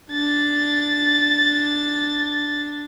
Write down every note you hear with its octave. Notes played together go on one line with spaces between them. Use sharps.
D4 A6